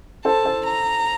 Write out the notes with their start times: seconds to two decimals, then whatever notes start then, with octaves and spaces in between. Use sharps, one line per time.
0.25 A4 C5 A5
0.45 A4 C5
0.65 A#5